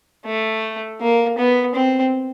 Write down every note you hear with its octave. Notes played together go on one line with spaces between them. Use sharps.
A3
A#3
B3
C4